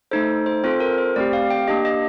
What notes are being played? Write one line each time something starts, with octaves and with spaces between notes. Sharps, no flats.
A3 D#4 A4 C5
C5
C4 F4 A4 C5
A#4
C5
A3 C4 G4 D5
F5
G5
A#3 D4 G4 D#5
D#5